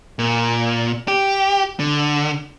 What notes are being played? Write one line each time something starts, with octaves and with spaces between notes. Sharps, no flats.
A#2
G4
D3